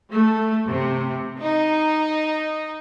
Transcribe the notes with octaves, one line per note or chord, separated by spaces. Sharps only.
A3
C3
D#4